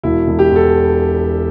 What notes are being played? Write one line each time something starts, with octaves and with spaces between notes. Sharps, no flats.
E1 E4
E1
G4
E2
A4